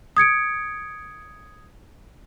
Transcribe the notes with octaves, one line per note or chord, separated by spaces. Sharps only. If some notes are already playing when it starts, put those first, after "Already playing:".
D#6 G#6 C#7 D7